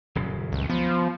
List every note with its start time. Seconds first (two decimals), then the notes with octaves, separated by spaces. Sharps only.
0.15 D#1 F#2 C#3
0.52 C#2
0.70 F3 B3